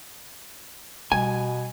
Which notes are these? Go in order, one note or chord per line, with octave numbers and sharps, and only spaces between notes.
B2 G3 G#5